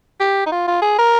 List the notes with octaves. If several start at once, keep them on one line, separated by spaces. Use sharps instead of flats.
G4
D#4
F4
F4
G#4
A#4